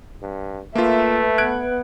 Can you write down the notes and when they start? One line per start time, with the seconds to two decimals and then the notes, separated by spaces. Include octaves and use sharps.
0.22 G2
0.75 A3 A#3 F4 B4 E5
1.38 B3 F#6 G#6 D7